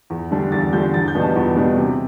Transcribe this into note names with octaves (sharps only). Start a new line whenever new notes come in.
E2
D3 G3 D4
E2 A6
D3 G3 D4 G6
E2 A6
G6
B2 G3 B3 D4
A5
E2 B4
B2 G3 B3 D4
C3